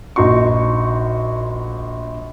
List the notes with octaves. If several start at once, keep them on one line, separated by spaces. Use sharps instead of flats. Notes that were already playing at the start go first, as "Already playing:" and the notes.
A#1 D#4 F#4 C6 C#6